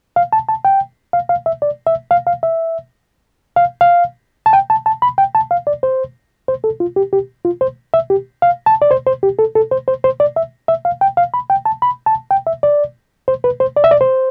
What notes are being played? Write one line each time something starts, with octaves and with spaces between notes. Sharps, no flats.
F5
A5
A5
G5
F5
F5
E5
D5
E5
F5
F5
E5
F5
F5
A5
G5
A5
A5
B5
G5
A5
F5
D5
C5
C5
A4
F4
G4
G4
F4
C5
E5
G4
F5
A5
D5
C5
C5
G4
A4
A4
C5
C5
C5
D5
E5
E5
F5
G5
F5
B5
G5
A5
B5
A5
G5
E5
D5
C5
B4
C5
D5
E5
D5
C5